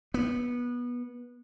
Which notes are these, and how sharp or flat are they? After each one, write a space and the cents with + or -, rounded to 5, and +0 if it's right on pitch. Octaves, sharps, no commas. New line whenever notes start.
B3 -20